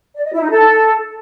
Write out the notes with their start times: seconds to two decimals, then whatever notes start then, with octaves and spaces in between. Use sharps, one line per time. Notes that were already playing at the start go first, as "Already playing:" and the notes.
0.15 D5
0.24 D#5
0.32 E4
0.41 D#4
0.50 A4